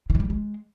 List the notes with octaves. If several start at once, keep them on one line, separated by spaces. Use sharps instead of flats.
D#3
E3
G3
C#3
G#3